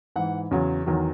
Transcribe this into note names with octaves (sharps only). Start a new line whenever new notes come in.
G#2 E3 F#5
E2 C#3 F#3
E2 D#3 F#3